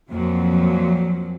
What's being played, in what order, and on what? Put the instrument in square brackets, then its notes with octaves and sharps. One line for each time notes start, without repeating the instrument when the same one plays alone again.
[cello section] F2 A#2 F#3